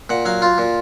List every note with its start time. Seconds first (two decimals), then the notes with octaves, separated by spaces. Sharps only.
0.10 A#2 F#5
0.25 F#3 F5
0.42 F4
0.58 A#2